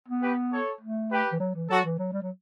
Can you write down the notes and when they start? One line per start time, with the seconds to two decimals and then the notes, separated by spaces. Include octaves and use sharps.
0.08 B3
0.22 G4 B4
0.52 A4 C#5
0.81 A3
1.11 G4 B4
1.32 E3
1.40 F#3
1.55 E3
1.70 F#3 F#4 A4
1.84 E3
1.99 F#3
2.13 G3
2.22 F#3